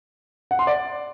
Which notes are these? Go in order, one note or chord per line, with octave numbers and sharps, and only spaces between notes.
F#5
C6
D5